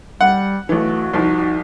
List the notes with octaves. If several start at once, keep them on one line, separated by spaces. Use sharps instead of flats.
G3 F#5
B1 E3 A3 F#4
C2 F3 D#4